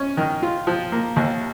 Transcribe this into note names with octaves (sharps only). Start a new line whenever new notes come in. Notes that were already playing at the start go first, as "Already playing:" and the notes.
Already playing: C#4
D#3
F4
F3
A#3
D#2